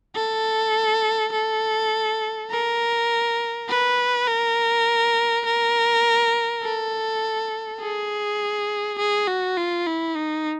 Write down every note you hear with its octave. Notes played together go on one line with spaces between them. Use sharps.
A4
A4
A#4
B4
A#4
A#4
A4
G#4
G#4
F#4
F4
E4
D#4